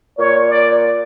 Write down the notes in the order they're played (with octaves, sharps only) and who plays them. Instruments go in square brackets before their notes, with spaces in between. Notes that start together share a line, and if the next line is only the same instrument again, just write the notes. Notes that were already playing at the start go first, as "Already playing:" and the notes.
[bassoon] A#2 [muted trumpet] C#5
[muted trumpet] D5